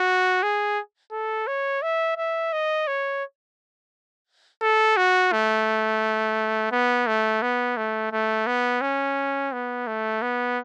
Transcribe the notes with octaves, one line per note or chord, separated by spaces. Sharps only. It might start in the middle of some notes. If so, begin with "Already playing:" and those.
Already playing: F#4
G#4
A4
C#5
E5
E5
D#5
C#5
A4
F#4
A3
B3
A3
B3
A3
A3
B3
C#4
B3
A3
B3